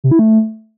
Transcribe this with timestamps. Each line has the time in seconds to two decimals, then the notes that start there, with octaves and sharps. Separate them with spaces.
0.04 C3
0.11 E4
0.19 A3